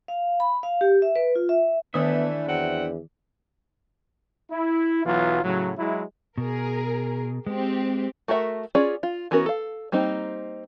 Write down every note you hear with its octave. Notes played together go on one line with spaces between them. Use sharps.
F5
B5
F5
G4
E5
B4
F4
E5
D#3 E3 A3 B3 D4 E4 E5 D#6
E2 F#3 C4 F#5
E4
B1 E3 F#3 B3 F4
A2 C#3 F#3
F#3 G#3 E4
B2 G#4 A#4
G#3 C4 G4
A3 F#4 A#4 E5 F#5
C#4 F4 G#4 D5
F4
E3 B3 C#4 F#4 A#4
A4 F5
G3 A#3 C4 D#4